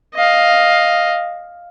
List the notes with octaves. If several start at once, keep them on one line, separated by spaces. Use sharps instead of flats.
D#5 F5